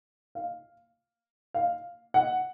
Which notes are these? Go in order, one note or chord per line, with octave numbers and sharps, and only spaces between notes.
F5
F5
F#5